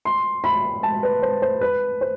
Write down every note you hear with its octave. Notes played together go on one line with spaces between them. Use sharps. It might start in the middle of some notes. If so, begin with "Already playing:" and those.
C6
B5
A5
B4
C5
C5
B4
C5